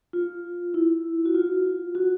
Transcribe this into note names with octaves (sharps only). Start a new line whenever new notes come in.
F4
E4
F#4
F4
F#4